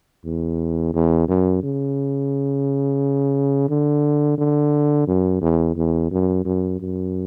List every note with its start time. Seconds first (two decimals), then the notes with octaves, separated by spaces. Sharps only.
0.24 E2
0.94 E2
1.28 F#2
1.63 C#3
3.69 D3
4.38 D3
5.07 F#2
5.41 E2
5.76 E2
6.11 F#2
6.45 F#2
6.80 F#2